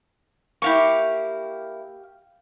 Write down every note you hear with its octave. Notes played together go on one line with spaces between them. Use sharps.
A#3 E4 G4 F5 C#6